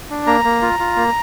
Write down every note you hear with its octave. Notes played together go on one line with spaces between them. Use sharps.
D4
A#3 A#5
A#3
F4
F4
A#3